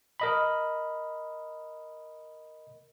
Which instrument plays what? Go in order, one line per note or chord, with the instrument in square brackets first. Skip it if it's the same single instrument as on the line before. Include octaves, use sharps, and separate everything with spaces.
[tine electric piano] A#4 D#5 B5